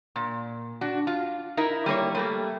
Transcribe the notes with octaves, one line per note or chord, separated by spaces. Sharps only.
A#2
D4 F#4
F4
D#4 E4 A#4 E5
G3 A#3 B4 C#5
G3 A3 A#3